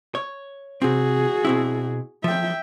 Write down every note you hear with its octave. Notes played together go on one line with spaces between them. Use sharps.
C#5
C3 C4 F#4 G#4
B2 C4 E4
F3 E5 G5